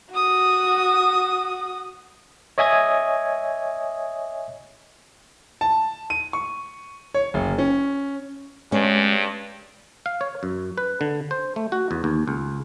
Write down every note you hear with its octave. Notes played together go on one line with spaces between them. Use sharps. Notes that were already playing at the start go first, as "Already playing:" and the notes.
F#4 D#6
C#5 D#5 E5 G#5 D#6 G#6
A5
D#7
C#6
C#5
F#1
C#4
G2 G#3 C#4
F5
C#5
F#2
B4
D3
C5
A3
F#4
E2
D#2
C#2